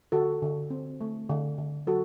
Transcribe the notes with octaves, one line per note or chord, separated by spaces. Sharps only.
D3 F#4 A4
D3
C4
A3
D3
D3
F#3 F#4 A4